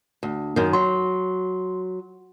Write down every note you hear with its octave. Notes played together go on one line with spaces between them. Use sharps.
D2
F#2 D#3
F#3 C6